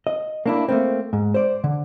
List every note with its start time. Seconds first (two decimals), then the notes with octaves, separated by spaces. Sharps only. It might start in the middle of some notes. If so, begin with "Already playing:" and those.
0.07 D#5
0.46 A#3 D4 E4
0.68 A3 A#3 C4
1.13 G#2
1.34 C5 D5
1.64 D3